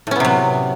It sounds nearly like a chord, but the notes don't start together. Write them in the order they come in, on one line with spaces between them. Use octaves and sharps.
A2 C#4 B3 C3 F#3